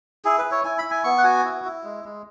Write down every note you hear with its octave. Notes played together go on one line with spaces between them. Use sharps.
E4 G#4
B4
E4
C#5
E4 G#5
B5
E4
G#5
B3 C#6
F#5
F#4 G#5
E4
E4
G#3
G#3